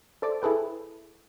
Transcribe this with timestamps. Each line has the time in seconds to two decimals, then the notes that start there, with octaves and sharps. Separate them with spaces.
0.22 A4 C5 D5 E5 D6
0.42 E4 G#4 A4 B4 G5